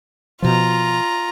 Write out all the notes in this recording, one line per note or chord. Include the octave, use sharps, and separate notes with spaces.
B2 F3 F4 A#5